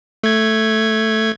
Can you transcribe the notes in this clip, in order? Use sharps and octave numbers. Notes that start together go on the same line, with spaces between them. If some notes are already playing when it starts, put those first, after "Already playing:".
A3 G#6